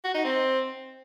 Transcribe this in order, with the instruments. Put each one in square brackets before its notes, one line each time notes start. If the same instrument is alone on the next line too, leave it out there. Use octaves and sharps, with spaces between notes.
[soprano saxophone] F#4
D#4
C4